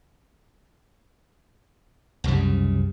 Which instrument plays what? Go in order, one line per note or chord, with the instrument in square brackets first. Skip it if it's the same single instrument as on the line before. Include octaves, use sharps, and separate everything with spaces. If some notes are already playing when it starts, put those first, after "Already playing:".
[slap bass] C2 F#2 C#3 G3